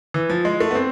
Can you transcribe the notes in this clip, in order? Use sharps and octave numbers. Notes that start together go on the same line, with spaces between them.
E3
F3
G#3
A3
B3
C4